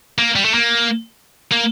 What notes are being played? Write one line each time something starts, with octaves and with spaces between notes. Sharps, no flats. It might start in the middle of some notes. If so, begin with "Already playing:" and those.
A#3
G3
A3
A#3
A#3